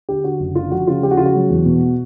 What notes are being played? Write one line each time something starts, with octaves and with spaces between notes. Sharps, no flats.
D3 G4
D3 F#4
F#1
D3 F4
F3 F#4
C#3 F4
F3 G4
F#4
C#3 F4
F#4
F#3
E2
B2